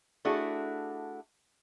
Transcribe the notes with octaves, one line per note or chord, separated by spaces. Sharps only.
A3 D4 E4 F#4 G#4